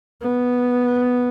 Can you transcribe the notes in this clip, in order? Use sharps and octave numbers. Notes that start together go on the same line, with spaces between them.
B3